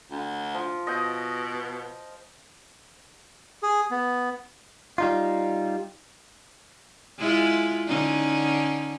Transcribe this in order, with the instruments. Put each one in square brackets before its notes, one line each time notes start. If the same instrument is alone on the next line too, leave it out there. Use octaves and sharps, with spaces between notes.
[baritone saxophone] D2
[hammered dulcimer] F3
[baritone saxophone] B2 [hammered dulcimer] D#5 G5
[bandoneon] G#4
B3
[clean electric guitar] G3 D#4 F4
[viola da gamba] G#3 E4 F4
D3 C#4 D#4